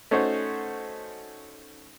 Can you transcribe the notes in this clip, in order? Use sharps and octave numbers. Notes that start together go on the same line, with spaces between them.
A3 C#4 D#4 F#4 C5